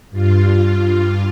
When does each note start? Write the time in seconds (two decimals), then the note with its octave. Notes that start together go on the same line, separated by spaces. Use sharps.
0.10 G2 F4